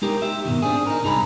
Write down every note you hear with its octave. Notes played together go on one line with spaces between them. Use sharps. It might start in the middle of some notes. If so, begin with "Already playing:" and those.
G#3 D#4 G4 A#4
G4 E5
G#2 B2 D#3
C4 D4 G#4
D#4 A#4
C2 G#2 D#4 G#4 A#5 B5